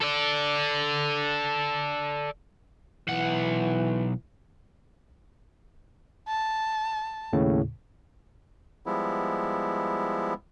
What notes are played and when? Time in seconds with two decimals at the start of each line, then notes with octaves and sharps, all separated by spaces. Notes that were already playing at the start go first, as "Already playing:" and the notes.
0.01 A4 D5
3.08 B1 E3 F#5
6.28 A5
7.33 D#2 A2 C#3
8.86 F3 G3 G#3 B3 E4